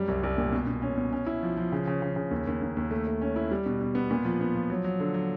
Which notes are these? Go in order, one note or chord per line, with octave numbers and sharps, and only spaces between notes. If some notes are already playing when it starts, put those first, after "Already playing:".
Already playing: F#2 G3
C2
C2
A#2
B2
B2
C#4
B2
C#4
E4
F3
F3
C#3
C#3
C#3
C#3
D#2
D#2
D#2
D#2
A3
A3
C#4
E4
G3
B2
B2
B3
A#2
F3
B3
F3
F#3
F#3
D3
F#3